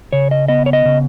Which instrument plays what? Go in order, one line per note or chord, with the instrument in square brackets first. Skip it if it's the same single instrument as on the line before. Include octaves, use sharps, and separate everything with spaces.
[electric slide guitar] C#3 C#5
D#5
B3 D#5
C#5
D#5
C#3